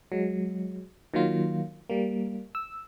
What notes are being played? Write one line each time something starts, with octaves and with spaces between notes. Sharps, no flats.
F#3 G#3
D#3 F#3 A#3 F4
G3 A#3
E6